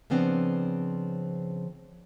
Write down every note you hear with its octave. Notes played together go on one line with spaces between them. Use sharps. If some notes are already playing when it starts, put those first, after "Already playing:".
C#3 F3 B3 C4 D4